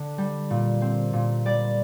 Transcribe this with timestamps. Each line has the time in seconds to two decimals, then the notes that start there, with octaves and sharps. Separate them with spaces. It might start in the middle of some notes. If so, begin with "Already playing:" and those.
Already playing: D3 D4
0.18 G3
0.50 A#2
0.81 C4
1.13 A#2
1.45 G3 D5